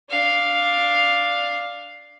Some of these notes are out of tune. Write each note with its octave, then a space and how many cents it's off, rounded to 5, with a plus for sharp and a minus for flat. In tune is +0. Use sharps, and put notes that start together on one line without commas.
D4 +0 F5 +0